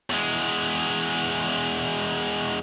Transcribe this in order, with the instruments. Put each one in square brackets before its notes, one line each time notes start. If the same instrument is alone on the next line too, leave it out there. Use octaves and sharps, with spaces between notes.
[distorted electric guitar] E2 G#3